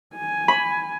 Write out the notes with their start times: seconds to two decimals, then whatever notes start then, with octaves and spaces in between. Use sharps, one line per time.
0.16 G#5
0.48 B5